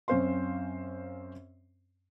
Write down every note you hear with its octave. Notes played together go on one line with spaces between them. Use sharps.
F#2 C4 C#4 C5 F5 C6